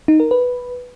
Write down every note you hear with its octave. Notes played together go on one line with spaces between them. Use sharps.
D#4
A#4
B4